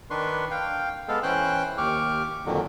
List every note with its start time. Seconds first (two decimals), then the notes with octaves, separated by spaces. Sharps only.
0.10 D#3 D4 B4 C6 C#6
0.51 F5 G5
1.08 G#3 B3 A4 F5
1.23 E3 C#4 C5 G5 C6 F#6
1.78 D#2 G4 C#6 D6 F6
2.46 F2 A#2 D3 D#3 F#3